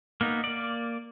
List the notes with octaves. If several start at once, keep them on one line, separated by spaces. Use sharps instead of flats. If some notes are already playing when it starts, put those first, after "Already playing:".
A#3 B3 D#4
A#3 D5